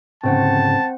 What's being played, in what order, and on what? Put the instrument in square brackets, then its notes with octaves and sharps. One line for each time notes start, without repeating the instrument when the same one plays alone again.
[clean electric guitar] D2 G#2 C#3 [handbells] C4 C5 F#5 [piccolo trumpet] A5